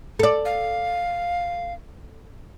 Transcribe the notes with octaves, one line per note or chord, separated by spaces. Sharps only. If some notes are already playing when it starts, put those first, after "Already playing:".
A4 D5
F5